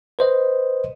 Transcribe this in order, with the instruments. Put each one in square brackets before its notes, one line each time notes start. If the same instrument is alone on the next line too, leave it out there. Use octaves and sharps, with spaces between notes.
[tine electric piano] B4 C5 D#5